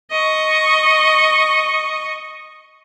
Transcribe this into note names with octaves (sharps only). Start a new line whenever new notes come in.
D#5 C#6